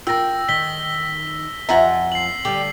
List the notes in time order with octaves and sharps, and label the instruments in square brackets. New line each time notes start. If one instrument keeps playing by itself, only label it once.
[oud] F4 A#4 [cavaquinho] G5 [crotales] E6 A#6
[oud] D#3 [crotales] B6 G7
[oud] F2 F4 E5 [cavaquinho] F#5 G#5 A#5
[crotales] C7 F#7
[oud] D3 G3 [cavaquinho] G4